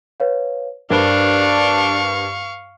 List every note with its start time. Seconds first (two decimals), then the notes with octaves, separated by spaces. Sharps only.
0.20 B4 C#5 F5
0.91 G2 D4 A#4 C5 F5 B5 C#6